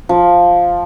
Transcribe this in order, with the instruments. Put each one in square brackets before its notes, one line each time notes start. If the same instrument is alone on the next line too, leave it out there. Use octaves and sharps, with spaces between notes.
[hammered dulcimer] F3